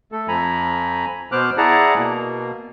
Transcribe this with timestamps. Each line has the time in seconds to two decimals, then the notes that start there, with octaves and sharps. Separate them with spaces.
0.12 A3 A4
0.28 F2 F3 G#5 A#5 B5
1.32 B2 B3 C5 D6 F6 F#6
1.58 E4 G#4 D5 F#5 A5 A#5
1.97 B2 A#3